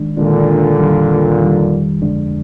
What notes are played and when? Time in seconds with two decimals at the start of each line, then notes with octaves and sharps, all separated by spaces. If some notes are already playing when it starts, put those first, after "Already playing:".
Already playing: D#3 G#3 D4
0.17 A#2 D3 D#3 G#3 D4
0.79 F2 D#3 G3
1.40 F2 D#3 G3
2.02 F2 D3 G#3 D4